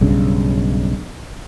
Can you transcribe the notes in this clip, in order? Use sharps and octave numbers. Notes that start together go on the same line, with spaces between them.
B1 G2 C#3